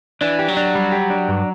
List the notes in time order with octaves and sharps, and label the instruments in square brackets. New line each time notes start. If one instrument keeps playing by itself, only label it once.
[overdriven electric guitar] E3 [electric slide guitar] D4
[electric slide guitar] G4
[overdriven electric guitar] F#3
[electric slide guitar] D4
G3
G4
D4
G2